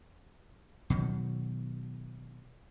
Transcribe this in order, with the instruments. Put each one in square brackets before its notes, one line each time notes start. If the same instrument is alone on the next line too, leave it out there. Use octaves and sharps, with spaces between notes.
[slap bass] B2 D#3 F#3